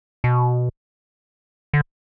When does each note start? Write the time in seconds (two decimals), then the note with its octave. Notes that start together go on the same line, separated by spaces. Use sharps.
0.24 B2
1.73 D3